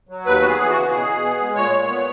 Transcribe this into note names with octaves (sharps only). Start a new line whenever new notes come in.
F#3
D#2 B4
B3 F#4
G#4
E3
F#4
C#3
B2 G#4
B2
B3
G#3
A#2 C#5
A#2
B3